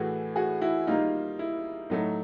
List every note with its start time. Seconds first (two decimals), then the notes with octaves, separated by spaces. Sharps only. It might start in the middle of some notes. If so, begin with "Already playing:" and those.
Already playing: A2 E3 A3 F#4 G#4
0.36 F#4 G#4
0.61 E4 F#4
0.87 D#3 G3 A#3 D#4 F4
1.39 E4
1.90 A2 F#3 A3 D#4